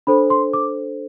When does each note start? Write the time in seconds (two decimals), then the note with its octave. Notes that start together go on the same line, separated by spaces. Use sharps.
0.07 D4 A4 C5 B5
0.30 C6
0.53 D6